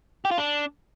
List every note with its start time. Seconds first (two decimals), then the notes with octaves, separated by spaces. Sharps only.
0.25 G4
0.31 F4
0.38 D4